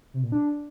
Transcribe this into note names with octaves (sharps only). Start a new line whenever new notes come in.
C3
A#2
D4